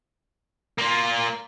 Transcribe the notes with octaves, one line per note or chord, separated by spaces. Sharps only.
A#3 F4